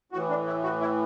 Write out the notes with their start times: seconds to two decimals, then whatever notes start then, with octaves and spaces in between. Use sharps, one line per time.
0.12 A2 F#4
0.16 E3
0.29 D4
0.47 E4
0.63 F#4
0.81 E4